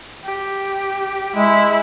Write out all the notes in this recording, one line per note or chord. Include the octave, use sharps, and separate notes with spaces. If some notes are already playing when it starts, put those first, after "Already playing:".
G4
G#3 E4